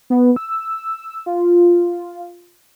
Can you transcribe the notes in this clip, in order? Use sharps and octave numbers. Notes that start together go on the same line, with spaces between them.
B3
E6
F4